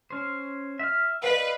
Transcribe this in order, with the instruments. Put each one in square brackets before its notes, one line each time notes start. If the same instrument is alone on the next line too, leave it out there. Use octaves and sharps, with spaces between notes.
[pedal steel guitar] C#4 C5
E5 F6
[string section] B4 [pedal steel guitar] D5 D#5 F5